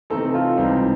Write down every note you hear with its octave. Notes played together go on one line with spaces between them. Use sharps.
C3 E3 A3 C4 D#4 A4
F4
C#2 C3 E3 G3 C4 D#4